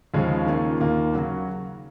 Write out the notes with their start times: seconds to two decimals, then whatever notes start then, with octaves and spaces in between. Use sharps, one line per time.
0.14 D#2 C#3 F3 G#3 C#4
0.46 D#3 A#3 C#4 F4
0.80 D#2 D#3 A#3
1.13 C#3 F#3 C#4 F#4